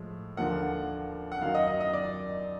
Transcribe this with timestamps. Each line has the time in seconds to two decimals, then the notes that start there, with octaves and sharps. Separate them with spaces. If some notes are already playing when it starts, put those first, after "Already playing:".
Already playing: A2 F3 G#3
0.37 D#2 D3 F3 A#3 F#5
1.32 F#5
1.41 F#2 D#3 F#3 F5
1.55 D#5
1.67 D#5
1.80 D#5
1.93 D5